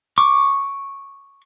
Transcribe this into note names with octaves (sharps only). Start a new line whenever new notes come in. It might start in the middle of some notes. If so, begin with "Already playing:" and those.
C#6 D6